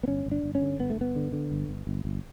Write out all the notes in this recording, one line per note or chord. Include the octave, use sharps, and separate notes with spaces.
B3
G1 C#4
G1
D4
G1
C#4
D3
G1 B3
A3
G1 B3
D3
D3
G1
G1
G1
G1